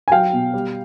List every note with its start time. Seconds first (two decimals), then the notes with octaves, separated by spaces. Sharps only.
0.08 G#5
0.11 F#3 F5 G5
0.33 B2
0.54 G3